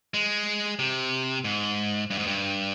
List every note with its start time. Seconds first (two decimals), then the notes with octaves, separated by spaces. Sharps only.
0.14 G#3
0.79 C3
1.44 G#2
2.10 G2
2.18 G#2
2.27 G2